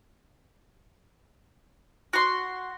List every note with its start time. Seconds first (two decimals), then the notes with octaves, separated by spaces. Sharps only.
2.13 F#4 C6